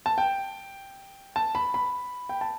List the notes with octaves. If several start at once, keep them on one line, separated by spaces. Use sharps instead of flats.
A5
G5
A5
B5
B5
G5
A5